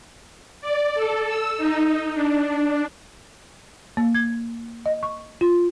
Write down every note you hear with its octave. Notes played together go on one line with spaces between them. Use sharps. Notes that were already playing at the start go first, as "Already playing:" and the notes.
D5
A4
E6
D#4
D4
A#3
G#6
D#5
C#6
F4